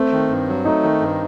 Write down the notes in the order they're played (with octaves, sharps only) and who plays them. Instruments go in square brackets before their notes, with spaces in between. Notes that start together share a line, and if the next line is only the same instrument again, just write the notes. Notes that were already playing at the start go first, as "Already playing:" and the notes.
Already playing: [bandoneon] A3 [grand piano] C4
[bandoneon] D#3
G2
F#3
[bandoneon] A3 [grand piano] D#4
[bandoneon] D#3
G2